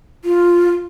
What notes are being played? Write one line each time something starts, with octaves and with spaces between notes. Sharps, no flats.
F4